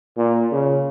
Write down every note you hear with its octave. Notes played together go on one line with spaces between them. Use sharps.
A#2
C#3